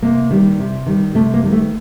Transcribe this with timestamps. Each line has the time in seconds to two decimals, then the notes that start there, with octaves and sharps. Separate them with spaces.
0.02 C3 A#3
0.31 D#3 G3
0.59 C3
0.86 D#3 G3
1.15 C3 A3
1.34 A#3
1.43 D#3 G3
1.52 A3